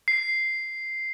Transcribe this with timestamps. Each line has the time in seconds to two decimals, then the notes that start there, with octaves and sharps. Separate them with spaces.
0.08 C7